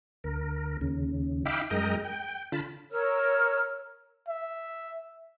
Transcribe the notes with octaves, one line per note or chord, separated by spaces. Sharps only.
D2 A#4
D#2 C#3
D#4 E5 F5 G5 B5 D6
F#2 G#3 A#4 D#5 G5 A#5
G5
D3 F4 A5 B5
A#4 C#5 E6 F6
E5